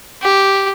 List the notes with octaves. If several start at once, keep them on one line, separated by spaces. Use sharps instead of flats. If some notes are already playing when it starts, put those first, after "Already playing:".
G4